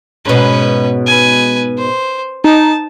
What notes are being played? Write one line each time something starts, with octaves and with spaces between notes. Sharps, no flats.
G#2 B2 C#4 B4
B4 G#5
C5
D#4 A5